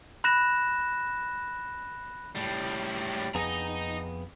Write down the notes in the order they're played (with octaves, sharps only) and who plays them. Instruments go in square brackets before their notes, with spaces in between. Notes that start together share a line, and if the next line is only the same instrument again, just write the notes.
[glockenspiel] B5 F#6 A#6 E7
[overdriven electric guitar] A2 G3
[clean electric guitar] F2 B3 G#4 [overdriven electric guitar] D#5 A#5